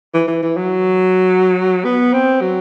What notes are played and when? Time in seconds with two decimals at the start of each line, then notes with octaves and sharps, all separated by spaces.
0.14 E3
0.28 E3
0.42 E3
0.57 F#3
1.84 B3
2.13 C4
2.41 F#3